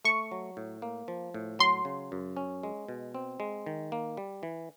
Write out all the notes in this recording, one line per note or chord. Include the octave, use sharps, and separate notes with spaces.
A3 C#6
F#3
A2
A#3
F3
A2
F#3 C6
C#3
F#2
C#4
G#3
B2
C4
G#3
D#3
A#3
G3
E3